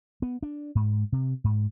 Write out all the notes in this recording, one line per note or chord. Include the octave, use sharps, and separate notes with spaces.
B3
D4
G#2
C3
G#2